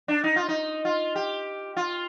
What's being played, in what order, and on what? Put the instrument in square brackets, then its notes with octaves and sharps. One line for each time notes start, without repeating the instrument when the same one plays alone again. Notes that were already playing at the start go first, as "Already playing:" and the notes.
[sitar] D4
D#4
F4
D#4
F4
G4
F4